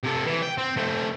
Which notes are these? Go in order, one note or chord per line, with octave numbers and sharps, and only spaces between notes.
C3 A4
E3
G5
C4
A3 C4